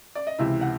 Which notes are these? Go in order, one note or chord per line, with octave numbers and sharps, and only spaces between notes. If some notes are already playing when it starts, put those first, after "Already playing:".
D5
D#5
C#2 C3 E3 E4 E5
F#5